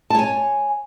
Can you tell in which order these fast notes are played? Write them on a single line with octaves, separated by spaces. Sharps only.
A5 C#5 G#5